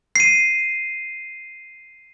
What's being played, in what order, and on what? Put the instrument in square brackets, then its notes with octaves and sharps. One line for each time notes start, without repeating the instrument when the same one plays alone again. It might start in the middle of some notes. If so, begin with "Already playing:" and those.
[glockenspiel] C7 D#7